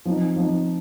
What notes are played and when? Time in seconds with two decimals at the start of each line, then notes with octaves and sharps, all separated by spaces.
0.05 F3 C4 D#4
0.36 F3 C4 D#4